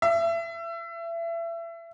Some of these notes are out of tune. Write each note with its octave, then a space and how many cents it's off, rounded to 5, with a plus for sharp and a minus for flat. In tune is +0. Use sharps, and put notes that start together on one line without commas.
E5 +30